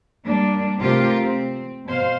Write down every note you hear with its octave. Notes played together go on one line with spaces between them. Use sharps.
G3 A#3 D4
C3 A3 C4 F4 G4 A#4
C4
B2 C5 F5